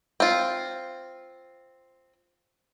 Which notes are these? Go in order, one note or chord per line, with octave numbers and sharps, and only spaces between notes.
C4 F4